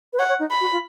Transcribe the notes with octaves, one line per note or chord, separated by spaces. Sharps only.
B4
C#5 F#5
C#5
D#4
B5
F#4
F4